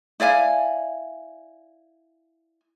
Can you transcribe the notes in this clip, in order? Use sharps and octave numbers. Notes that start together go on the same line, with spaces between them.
E4 D5 F5 G#5